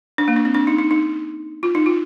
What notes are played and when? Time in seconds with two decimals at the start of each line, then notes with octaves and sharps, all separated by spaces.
0.18 D4
0.28 A#3
0.36 D4
0.45 C4
0.54 D4
0.67 D#4
0.78 D#4
0.91 D#4
1.63 F4
1.75 D#4
1.86 F4